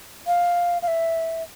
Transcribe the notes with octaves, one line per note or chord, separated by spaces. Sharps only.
F5
F5
E5